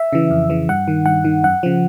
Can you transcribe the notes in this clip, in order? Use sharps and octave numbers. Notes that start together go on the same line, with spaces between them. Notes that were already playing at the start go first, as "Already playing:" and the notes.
Already playing: E5
C#3 E3
F2
C#3 E3
G2 F#5
D#3
G2 F#5
D#3
F#2 F#5
C#3 F3